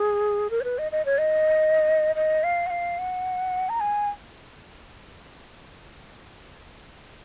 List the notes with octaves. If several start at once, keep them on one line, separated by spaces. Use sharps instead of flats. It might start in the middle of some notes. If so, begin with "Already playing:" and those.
Already playing: G#4
A#4
C#5
B4
D#5
D#5
C#5
D#5
D#5
F5
F#5
F5
F#5
A#5
G#5